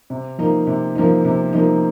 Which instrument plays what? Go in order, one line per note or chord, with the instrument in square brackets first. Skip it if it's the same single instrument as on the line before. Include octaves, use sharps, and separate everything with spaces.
[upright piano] C3
F3 A#3 D#4
C3
F3 A#3 D#4
C3
F3 A#3 D#4